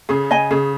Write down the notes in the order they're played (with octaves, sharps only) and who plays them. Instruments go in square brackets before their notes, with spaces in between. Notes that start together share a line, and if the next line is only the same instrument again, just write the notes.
[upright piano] C#3 [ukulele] G#4
[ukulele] D#5 G#5
[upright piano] C#3 [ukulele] G#4